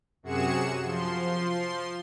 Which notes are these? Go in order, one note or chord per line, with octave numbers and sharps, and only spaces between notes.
F#2 C3 F#4 G#4 C#7 E7
F3 C6